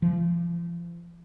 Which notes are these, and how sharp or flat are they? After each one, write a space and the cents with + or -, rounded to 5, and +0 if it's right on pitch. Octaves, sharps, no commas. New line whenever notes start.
F3 -35